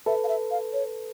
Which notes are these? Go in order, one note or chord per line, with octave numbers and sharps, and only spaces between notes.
A4 B4 E5
F5
E5
F5
C#5